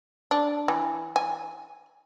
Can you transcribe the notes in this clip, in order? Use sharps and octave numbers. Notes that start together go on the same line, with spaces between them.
D4
E3
G#5